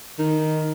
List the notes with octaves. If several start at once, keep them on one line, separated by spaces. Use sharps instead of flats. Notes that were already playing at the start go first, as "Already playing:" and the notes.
D#3